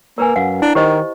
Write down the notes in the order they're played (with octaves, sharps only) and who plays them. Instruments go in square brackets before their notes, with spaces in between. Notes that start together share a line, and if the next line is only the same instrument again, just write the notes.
[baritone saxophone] A#3 [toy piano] A#4 B4 G#5
[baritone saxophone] F#2 [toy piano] F5 F#5
[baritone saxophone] D4 [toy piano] E4 A#5
[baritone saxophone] D#3 [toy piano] G4 C5 D#5